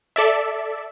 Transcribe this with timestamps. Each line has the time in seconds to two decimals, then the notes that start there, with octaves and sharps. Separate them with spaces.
0.16 A4 D5 E5